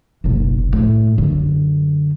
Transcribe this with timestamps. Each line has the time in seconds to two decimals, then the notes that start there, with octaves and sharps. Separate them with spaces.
0.24 F#1 B1
0.73 A2
1.18 F#2 D3